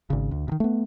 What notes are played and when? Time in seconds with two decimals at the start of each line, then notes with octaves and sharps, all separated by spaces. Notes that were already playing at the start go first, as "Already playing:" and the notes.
0.10 G#1 C#3
0.31 D2
0.48 C3 D#3
0.60 A3 B3